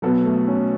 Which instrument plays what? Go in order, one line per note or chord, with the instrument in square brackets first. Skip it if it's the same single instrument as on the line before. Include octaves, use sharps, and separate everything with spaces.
[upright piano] B2 B3 A4 [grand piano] F#3
[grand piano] A3
C#4